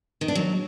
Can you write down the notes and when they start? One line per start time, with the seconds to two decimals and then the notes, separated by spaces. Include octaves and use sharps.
0.21 D#3
0.28 D4
0.35 F#3